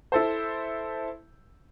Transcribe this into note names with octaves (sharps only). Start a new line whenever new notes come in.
E4 A4 C5